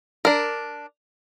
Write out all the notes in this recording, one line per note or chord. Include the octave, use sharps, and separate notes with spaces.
D4 A#4